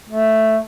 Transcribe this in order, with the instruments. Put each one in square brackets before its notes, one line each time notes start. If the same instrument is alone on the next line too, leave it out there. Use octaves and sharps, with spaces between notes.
[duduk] A3